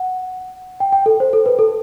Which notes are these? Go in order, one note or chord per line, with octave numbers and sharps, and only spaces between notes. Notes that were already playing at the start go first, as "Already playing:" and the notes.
Already playing: F#5
G5
G5
A4
C5
A4
B4
A4